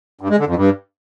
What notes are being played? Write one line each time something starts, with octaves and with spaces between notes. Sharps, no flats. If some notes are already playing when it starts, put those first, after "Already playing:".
G2
G#3
D3
F2
G2